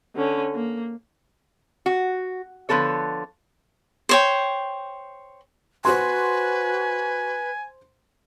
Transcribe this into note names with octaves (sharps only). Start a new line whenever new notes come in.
D3 C#4
A#3
F#4
D3 F3 B3 A4 C#5
C5 C#5 G5
F#4 B4 C5 G#5 C6